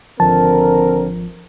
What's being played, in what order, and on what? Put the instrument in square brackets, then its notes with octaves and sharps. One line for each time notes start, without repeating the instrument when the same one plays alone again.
[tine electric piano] G#1 F3 [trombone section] D3 C4 A#4 [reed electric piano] A5